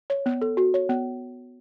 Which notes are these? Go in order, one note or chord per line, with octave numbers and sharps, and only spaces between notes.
C#5
B3
A4
F#4
C#5
B3